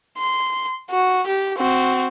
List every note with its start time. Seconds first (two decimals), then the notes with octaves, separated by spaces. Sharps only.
0.18 C6
0.90 F#4
1.27 G4
1.58 C4 F#4